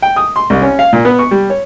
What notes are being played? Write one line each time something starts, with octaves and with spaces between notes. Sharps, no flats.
G5
D#6
C6
C2
C#4
F5
A#2
B3
C#6
G3
C#5